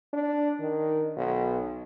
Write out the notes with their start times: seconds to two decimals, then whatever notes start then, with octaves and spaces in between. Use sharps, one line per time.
0.13 D4
0.60 D#3
1.17 B1